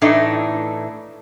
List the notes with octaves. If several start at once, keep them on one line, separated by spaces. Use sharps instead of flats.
A2 E3 A3 D4 D#4